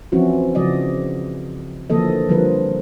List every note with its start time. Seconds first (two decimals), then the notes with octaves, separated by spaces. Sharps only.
0.12 E3 F3 C4 C#4 E4 F#4
0.55 C#3 F3 F#4 D5 D#5
1.90 D3 E3 F3 A#3 A4 D#5
2.29 D3 F3 G3 A#4 B4